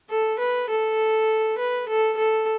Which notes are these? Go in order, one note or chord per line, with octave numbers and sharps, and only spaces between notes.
A4
B4
A4
B4
A4
A4